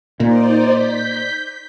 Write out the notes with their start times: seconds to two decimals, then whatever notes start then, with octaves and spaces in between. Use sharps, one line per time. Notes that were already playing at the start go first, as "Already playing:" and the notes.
0.20 A#2 D#4 C5 D5
0.71 G6 B6